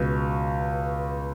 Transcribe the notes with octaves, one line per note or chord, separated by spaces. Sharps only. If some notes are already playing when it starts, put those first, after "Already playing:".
Already playing: C#2 B2